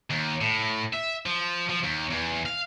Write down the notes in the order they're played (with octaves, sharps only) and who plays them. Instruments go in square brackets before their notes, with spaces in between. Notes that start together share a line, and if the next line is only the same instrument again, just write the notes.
[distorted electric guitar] D#2
A2
E5
F3
F3
D#2
E2
F5